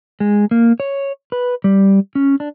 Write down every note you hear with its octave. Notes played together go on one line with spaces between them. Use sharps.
G#3
A#3
C#5
B4
G3
C#4
D4